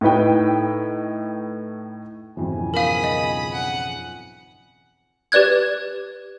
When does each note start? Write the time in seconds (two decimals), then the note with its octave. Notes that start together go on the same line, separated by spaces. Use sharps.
0.01 A2 D#4 B4 G5
2.37 B1 F2 G#2 C#3 E3 G#5
2.74 A#4 F5 B5 D#6
3.04 D#5
3.52 F#5
5.32 G4 B4 D5 F#6 G#6